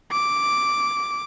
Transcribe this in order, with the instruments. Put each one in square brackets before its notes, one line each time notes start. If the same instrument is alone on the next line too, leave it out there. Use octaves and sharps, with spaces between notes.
[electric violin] D6